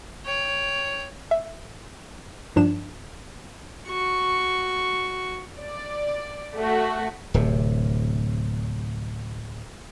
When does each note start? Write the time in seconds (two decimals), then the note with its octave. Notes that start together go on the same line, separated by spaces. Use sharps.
0.25 C#5 G5
1.31 E5
2.56 G2 F3 D4 E7
3.88 F#4 C#6
5.60 D5
6.56 A3 F#4
7.34 D1 C3